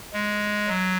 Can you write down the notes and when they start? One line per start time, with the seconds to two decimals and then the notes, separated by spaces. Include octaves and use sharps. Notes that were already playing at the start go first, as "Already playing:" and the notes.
0.14 G#3
0.68 F#3